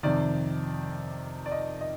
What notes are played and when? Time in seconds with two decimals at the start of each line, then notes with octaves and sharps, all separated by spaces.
0.03 F2 C3 D#3 D5
1.46 D5
1.52 D#5
1.81 D#5